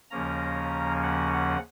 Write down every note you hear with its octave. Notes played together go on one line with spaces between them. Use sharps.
D#2 C#3 F3 A#3 C#4 A#5
F#5
F#5